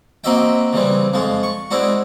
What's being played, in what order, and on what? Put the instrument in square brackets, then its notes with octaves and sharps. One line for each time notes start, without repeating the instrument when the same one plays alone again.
[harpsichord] A#3 C4 F#4 D#5 E5 G5
C#3 E3 G3 C4
F2 G#3 F4
C#6
G#3 C4 D4 E4 F#4